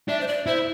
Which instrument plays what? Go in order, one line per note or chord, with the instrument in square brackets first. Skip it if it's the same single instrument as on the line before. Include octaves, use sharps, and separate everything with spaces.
[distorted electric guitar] D4 [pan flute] E5
[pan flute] C5
D5
[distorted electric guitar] E4 [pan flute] C5